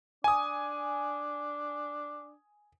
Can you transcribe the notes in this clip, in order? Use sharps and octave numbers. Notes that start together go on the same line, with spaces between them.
D4 G#5 D#6